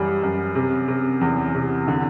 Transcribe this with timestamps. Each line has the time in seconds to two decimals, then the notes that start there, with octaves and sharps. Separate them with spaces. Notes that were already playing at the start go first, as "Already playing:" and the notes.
Already playing: F#2 E3 G3
0.23 F#2
0.55 C3
0.88 C3
1.21 E2
1.55 C3
1.88 D3